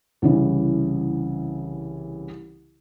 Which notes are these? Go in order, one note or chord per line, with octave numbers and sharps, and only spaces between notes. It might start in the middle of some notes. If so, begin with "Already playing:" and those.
C2 C#3 E3